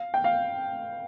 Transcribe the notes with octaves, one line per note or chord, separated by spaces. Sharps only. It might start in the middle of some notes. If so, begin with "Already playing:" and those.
Already playing: F5
G5
F5